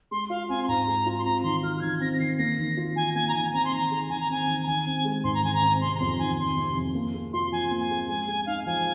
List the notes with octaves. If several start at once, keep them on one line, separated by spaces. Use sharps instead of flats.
G#3 C6
F4 F5
C4 G#5
C6
G#2 A#5
G#3
F4
C6
C4 A#5
D#3 C6
F4 F6
F6
D#3 G#6
C4 A#6
A#6
D#3 C7
A#3 A#6
D#3
F4
D#3 G#5
A#3 G#5
A#5
D#3 G#5
C4 A#5
C6
D#3 A#5
G#4
D#3 G#5
A#5
C4 G#5
D#3
A#5
D#3 G#5
C4
G#3
G#2 C6
A#5
D#3 G#5
A#5
C4
C3 C6
A#5
F2 C6
D#3 G#5
F2 C6
C3
F2
A#3
G#4
F4 C6
F3 G#5
A#3
G#5
G#4
G#3 G#5
G#4 G#5
D#4 F5
F3 G#5